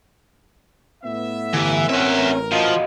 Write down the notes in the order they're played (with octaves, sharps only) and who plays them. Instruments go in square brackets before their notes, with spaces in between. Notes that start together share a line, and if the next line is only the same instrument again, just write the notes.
[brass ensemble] A2 B3 E5
[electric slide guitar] D3 G4 [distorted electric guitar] E3
[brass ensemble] A1 A#4 [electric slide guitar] C4 C#4 C#5 [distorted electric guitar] F#4 E5
[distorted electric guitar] F3 [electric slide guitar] F#4 D#5 F5